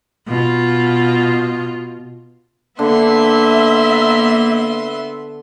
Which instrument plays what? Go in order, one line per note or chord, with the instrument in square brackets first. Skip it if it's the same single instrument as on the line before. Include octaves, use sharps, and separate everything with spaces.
[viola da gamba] B2 F4
[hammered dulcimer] D3 [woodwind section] A#3 [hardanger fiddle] B3 C6 [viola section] E5